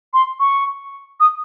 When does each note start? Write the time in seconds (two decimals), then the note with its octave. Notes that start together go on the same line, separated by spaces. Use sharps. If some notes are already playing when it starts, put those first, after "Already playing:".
0.13 C6
0.39 C#6
1.20 D#6